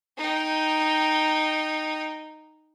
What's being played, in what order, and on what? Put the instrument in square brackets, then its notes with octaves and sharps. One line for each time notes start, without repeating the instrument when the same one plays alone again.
[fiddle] D#4 G5